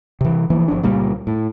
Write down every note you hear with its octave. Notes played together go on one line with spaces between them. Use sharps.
C3 E3
E3 F3 A#3
G1 F3 D4
C#2 A#2 G3 A#3
A2